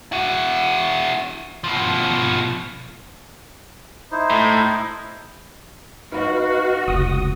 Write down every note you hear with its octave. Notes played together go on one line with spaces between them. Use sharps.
E4 F#4
B2 F3
D#4 E4 C5
A2
D#4 F#4 B4 F5
F1 C#2 D#6